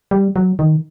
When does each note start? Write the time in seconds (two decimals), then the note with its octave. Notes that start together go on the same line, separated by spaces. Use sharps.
0.11 G3
0.36 F#3
0.59 D#3